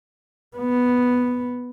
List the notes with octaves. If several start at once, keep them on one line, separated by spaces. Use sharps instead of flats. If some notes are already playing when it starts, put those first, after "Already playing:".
B3